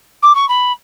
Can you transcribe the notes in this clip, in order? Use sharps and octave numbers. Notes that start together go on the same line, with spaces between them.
D6
C#6
B5